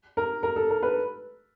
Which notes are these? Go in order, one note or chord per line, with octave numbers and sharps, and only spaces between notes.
A#4
A#4
A4
A#4
B4